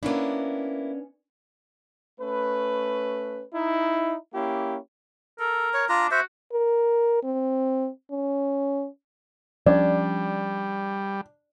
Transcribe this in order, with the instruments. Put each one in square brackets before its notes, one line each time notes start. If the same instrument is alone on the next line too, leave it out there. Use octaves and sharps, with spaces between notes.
[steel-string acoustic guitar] A#3 E4 [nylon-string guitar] B3 C#4 D4
[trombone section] A3 C#4 B4
D#4 E4
A#3 C#4 E4 G4
[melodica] A4 [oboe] A#4
[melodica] C#5
[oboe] D4 [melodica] F4 A#5
[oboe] F#4 [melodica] C5 E5
[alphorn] A#4
C4
C#4
[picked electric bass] F3 C#4 [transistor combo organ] G3 [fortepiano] D4 [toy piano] D5